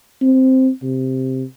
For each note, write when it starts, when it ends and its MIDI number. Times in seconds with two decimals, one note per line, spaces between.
0.22 0.70 60
0.83 1.43 48